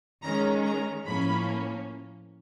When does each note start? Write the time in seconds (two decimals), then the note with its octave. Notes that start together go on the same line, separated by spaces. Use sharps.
0.22 D#3 G#3 C#4 A#5
0.64 A#5
1.05 A2 F3 A#3 C#4 B5